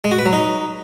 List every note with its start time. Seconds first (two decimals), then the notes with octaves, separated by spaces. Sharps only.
0.04 G#3
0.11 F#4
0.19 B4
0.26 F#3
0.33 D#4